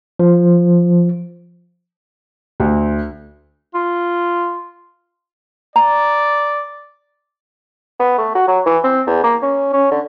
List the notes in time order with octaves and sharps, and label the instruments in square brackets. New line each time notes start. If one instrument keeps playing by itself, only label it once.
[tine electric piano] F3
[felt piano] D2
[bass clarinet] F4
[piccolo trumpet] D5 [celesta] A#5
[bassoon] B3
A3
F#4
F#3
E3
C4
E2
A#3
C#4
C#4
D3